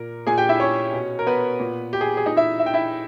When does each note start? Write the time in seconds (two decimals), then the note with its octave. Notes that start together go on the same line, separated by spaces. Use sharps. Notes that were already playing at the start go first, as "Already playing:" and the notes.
Already playing: A#2 A#4
0.27 A#2 G#4 G#5
0.38 G4 G5
0.49 E4 E5
0.60 C#4 C#5
0.93 B2
1.19 A#4
1.27 B3 B4
1.60 A#2
1.93 G4
2.01 G#4
2.17 G#4
2.26 A#2 D#4 D#5
2.37 E4 E5
2.59 E5
2.66 G5
2.74 E4 E5